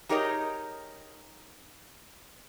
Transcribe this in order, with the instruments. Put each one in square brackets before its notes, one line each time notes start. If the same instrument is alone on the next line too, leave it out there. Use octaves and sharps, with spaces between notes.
[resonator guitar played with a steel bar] D#4 G4 G#4 A#4 C#5 D#5